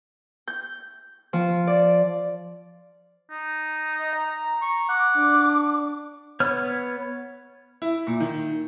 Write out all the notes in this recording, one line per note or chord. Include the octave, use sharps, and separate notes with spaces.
G6
F3
D5
D#4
D#5
A#5
C#6
F#5 D6
D4
B3 C#5 F6
E4
A#2
D#3